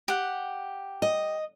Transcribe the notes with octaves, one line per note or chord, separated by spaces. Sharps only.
G4 F#5
D#5